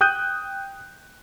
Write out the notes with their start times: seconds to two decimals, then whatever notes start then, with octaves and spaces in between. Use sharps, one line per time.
0.01 G5 D#6 F#6 G6 D#7